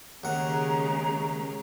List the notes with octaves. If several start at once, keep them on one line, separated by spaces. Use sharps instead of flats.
D#2 C#3 G#3 F#5 A#5